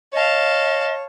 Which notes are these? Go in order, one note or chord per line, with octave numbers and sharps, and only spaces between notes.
C#5 D#5 F5 A5